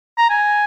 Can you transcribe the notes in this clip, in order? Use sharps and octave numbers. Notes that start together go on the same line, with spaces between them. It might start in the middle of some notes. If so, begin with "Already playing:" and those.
A#5
G#5